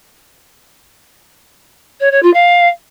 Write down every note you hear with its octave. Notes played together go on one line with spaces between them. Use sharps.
C#5
C#5
F4
F5